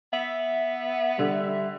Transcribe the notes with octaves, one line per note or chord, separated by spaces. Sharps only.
B3 E5
D3 G3